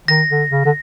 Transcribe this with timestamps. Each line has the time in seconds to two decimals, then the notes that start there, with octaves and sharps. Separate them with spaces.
0.08 D#3 A#6
0.30 D3
0.50 C#3
0.66 D3